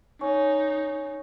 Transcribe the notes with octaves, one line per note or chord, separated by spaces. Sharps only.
C#4 D#4